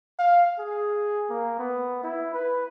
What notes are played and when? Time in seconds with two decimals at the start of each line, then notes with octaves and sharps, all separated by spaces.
0.19 F5
0.59 G#4
1.30 A#3
1.59 B3
2.03 E4
2.34 B4